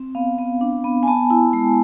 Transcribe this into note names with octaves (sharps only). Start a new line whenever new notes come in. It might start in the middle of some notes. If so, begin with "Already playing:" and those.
Already playing: C4
B3 F5
B3
D4
B3
G#5
B3 A5
E4
G#3